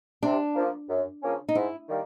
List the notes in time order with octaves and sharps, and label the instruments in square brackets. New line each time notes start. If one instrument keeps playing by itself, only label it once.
[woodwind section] C3 [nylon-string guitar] D4
[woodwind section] F3 A#3
F#2
C#3 F3 A#3 C#4
[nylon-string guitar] D#4
[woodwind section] G#2 [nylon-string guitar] E4
[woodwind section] D#3 G3 A#3